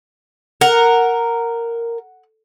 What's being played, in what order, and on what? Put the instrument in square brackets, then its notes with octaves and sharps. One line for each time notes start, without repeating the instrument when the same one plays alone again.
[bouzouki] A#4 [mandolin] F#5